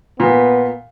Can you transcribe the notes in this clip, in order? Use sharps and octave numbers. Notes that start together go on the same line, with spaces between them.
A#2 B3